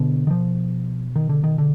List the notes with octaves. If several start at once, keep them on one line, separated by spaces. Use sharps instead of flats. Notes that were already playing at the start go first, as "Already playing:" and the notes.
Already playing: B2 D3
D#3
B2 F3
D#3
D3
D#3
D3